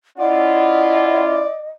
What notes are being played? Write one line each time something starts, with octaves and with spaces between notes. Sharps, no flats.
C#4 E4 F4 D5 D#5 F#5